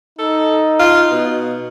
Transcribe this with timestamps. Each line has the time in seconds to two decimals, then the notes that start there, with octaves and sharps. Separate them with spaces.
0.19 D#4 A4
0.79 F4
1.11 B2